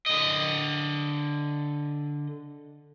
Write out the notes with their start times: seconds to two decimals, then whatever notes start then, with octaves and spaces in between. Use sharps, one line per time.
0.06 D3 D#5